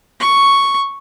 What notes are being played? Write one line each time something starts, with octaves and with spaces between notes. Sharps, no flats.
C#6